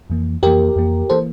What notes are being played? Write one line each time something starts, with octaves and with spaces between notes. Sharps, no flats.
F2 E3 A#3
F2 E3 A#3 G4 A#4
F2 E3 A#3
E3 A#3 A4 C5